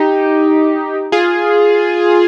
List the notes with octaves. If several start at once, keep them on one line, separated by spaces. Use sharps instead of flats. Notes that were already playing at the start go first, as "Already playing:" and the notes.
Already playing: D#4 G4
F4 G#4